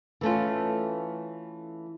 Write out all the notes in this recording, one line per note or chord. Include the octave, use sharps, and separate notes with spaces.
E3 A3 C#4 F4